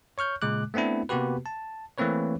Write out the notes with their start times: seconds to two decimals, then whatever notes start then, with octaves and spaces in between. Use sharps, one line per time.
0.18 C#5 C#6 F6 G6
0.42 A#2 C#3 G#3 D6 F#6
0.74 A3 B3 C4 D4 E4
1.09 C3 A#3 B3 F#4 G4 B4
1.46 A5
1.98 E3 A3 A#3 C4 B4 C#5